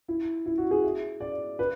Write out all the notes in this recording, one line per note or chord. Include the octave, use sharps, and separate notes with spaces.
E4
E4
F#4
G#4
E5
D5
B4